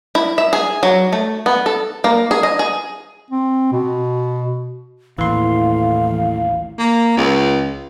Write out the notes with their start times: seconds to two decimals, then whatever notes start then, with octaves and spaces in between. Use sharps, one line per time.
0.15 E4
0.38 E5
0.53 G#4
0.83 F#3
1.13 A3
1.46 B3
1.66 A4
2.04 A#3
2.31 G#4
2.43 D#5
2.59 G#4
3.30 C4
3.72 B2
5.19 A1 D#2 A2 E3 F5 C6
6.78 A#3
7.17 C#2